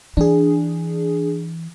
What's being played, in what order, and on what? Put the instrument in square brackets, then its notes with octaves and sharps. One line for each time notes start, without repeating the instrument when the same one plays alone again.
[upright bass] E3 [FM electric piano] D4 G#4